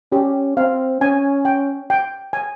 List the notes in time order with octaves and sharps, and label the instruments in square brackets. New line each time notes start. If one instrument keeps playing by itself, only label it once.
[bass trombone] C#4 [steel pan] G4
[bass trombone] C4 [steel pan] F5
[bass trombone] C#4 [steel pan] G#5
[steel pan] G5
G5
G#5